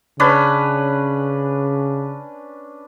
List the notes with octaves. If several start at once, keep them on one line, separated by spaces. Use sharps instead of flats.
C#3 C#4 D4 B4